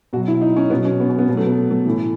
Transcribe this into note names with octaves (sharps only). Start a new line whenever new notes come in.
B2 F#3 F#4
E4
D#4
C#4
B2 F#3 B3
C#4
B3
C#4
B3
B2 F#3
A3
B3
A3
A2 E3